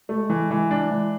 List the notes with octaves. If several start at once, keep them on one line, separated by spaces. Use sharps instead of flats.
G#3 A3
E3
E3
D4
E3 G#3